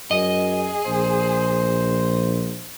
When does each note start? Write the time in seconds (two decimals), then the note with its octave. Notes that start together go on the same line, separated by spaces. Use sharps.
0.11 F#2 G#4 D#5
0.86 A#1 C5